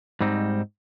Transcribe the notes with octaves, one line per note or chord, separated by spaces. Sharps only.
G#2 G3 C4 D#4